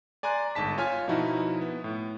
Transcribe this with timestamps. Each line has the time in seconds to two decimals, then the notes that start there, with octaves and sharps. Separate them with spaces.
0.23 D5 G#5 A#5 C6 F#6
0.55 G1 G#2 A5 B6
0.78 F4 C#5 G#5 F6
1.08 B2 F3 D#4 E4 F#4
1.61 B3
1.84 A2